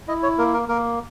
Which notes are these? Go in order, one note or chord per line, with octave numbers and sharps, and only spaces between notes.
E4 D#5
C#5
A#3 A#4
A#4
A#3 A#4